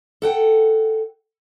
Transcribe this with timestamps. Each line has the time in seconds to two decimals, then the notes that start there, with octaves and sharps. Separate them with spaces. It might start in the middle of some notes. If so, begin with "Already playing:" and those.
0.22 A4 F#5 G5